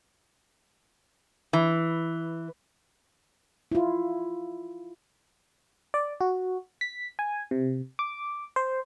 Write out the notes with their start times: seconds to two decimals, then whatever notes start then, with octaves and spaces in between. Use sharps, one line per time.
1.53 E3
3.72 E4 F4
5.94 D5
6.21 F#4
6.81 B6
7.19 G#5
7.51 C3
7.99 D6
8.56 C5